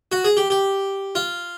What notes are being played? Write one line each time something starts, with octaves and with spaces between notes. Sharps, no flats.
F#4
G#4
G4
G4
F4